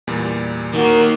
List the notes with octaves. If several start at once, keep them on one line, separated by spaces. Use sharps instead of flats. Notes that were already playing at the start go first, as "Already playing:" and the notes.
E2 A#2 G3
D#3 A#3 F#4 A#4